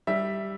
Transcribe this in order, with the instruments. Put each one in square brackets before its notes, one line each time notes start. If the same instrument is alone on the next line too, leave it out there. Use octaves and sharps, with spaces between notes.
[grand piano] G3 E5